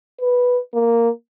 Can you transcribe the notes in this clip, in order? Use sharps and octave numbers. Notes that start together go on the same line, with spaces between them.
B4
A#3